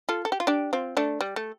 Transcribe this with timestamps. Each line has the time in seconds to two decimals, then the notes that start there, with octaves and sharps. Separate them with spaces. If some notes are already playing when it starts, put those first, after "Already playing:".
0.09 F4 A4
0.25 A4
0.32 G4
0.40 F4
0.47 D4 G4
0.73 C4 F4
0.97 A3 D4
1.21 G3
1.36 A3